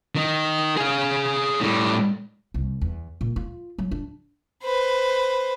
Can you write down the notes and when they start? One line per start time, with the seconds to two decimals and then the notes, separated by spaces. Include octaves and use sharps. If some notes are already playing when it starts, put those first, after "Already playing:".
0.15 D#3
0.77 G#4 F5
1.61 A2 G3
2.54 C2
2.81 E2
3.21 A#2
3.36 F4
3.78 F#3
3.91 D4
4.63 B4 C5